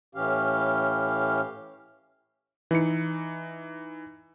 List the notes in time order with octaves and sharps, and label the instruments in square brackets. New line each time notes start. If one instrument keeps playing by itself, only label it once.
[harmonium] A2 E3 C#4 G4 F5
[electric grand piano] E3 D#4 C#7